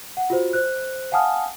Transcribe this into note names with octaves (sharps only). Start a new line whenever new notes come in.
F#5
F4 F#4 C5
C5 F#6
F5 F#5 G#5 A5 D#6 F6